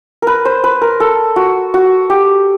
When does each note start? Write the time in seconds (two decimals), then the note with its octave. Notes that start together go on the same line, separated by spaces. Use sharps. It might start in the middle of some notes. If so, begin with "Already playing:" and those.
0.22 A#4 B4
0.45 C5
0.64 B4
0.82 A#4
1.00 A4
1.36 F#4
1.74 F#4
2.10 G4